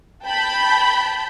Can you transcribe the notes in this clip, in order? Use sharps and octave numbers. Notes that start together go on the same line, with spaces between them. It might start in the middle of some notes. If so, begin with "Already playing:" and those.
G5 A5 B5 G6